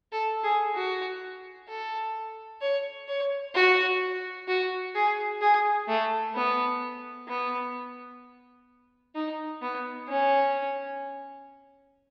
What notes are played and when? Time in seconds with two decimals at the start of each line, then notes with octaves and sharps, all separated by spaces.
0.12 A4
0.44 G#4
0.75 F#4
1.68 A4
2.61 C#5
3.08 C#5
3.54 F#4
4.48 F#4
4.95 G#4
5.41 G#4
5.88 A3
6.35 B3
7.28 B3
9.15 D#4
9.62 B3
10.08 C#4